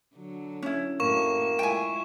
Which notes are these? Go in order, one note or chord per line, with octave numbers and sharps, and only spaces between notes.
D3 F#3
C#4 E4
F#2 A2 A#3 F#4 C#6 E7
G#3 E4 F4 G5 G#5